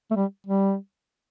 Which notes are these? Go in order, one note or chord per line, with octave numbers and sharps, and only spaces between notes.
A3
G3
G3